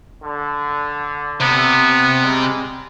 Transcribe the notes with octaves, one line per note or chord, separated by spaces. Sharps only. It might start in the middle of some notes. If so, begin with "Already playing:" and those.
D3
C3 B3
G3 G#3